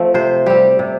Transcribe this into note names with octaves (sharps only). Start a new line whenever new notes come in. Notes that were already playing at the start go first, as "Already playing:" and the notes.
Already playing: F3 A3 C4
C3 C5
G3 C4 G4
C3